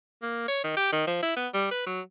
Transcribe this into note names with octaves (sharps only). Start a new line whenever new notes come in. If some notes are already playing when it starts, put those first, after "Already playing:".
A#3
C#5
D#3
G4
D#3
F3
E4
B3
G3
B4
F#3